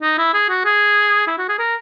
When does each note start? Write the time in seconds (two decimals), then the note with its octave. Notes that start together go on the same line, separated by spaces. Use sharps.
0.02 D#4
0.18 E4
0.34 G#4
0.50 F#4
0.65 G#4
1.27 E4
1.38 F#4
1.49 G#4
1.59 A#4